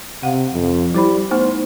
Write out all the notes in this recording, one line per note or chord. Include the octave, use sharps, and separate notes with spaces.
C3 F5 F#5
F2
G3 E4 C5 B5
A3 B3 D#4 C5